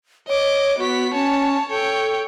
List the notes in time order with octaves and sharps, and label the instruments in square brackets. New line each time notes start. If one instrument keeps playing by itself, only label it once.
[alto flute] C#5 [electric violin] D#5 D6
[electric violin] B3 B6 [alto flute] F#4
[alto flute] C#4 [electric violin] C#5 A5
[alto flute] A4 [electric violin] C#5 G5